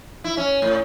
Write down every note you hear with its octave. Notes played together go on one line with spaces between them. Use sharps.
E4
C#4
A2